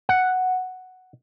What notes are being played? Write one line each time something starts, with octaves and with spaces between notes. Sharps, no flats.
F#5